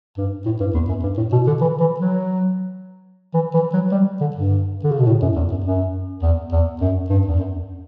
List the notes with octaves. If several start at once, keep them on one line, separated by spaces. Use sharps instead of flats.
G2
A2
G2
E2
F#2
G2
A2
B2
D3
E3
E3
F#3
E3
E3
F#3
G3
D3
G2
D3
C#3
B2
A2
F#2
E2
F#2
F#2
E2
E2
F#2
G2
E2
F#2